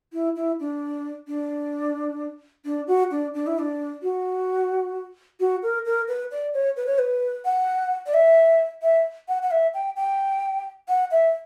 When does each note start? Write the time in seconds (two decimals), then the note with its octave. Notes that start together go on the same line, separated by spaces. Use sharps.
0.13 E4
0.36 E4
0.60 D4
1.28 D4
2.65 D4
2.87 F#4
3.11 D4
3.34 D4
3.47 E4
3.59 D4
4.03 F#4
5.40 F#4
5.63 A#4
5.85 A#4
6.08 B4
6.31 D5
6.54 C#5
6.77 B4
6.87 C#5
6.99 B4
7.45 F#5
8.06 D5
8.14 E5
8.82 E5
9.28 F#5
9.42 F#5
9.51 E5
9.74 G5
9.96 G5
10.88 F#5
11.11 E5